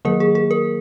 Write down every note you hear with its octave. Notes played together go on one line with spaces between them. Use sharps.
D#3 F#3 A#3 A#4
G#4
G#4
A#4